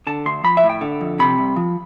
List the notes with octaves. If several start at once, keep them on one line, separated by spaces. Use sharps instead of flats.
D3 A5
D2 C6
F3 B5
E5
A2
G5
D3
F2
C3 B5
C2
F3